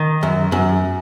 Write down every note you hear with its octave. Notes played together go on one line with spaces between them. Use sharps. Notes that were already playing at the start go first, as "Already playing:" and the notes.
Already playing: D#3
F#2
F#2